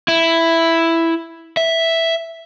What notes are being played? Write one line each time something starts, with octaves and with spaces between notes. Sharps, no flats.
E4
E5